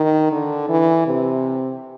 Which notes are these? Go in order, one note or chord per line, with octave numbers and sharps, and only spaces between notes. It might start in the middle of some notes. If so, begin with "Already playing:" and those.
Already playing: D#3
D3
E3
C3